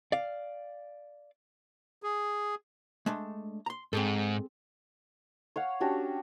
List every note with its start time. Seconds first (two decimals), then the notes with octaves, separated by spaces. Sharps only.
0.12 D5 F5
2.03 G#4
3.06 G#3 A3 D4
3.66 A#5 C6
3.93 G#2 C4 G#4 A4
5.56 C#5 F5 F#5
5.80 C#4 D4 F#4 G4